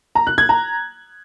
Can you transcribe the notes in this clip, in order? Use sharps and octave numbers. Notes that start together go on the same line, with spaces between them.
A#5
F#6
G#6
A#5